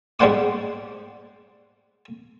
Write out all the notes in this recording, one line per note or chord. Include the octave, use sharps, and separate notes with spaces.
G#2 G3 D4 C5 F#5 D6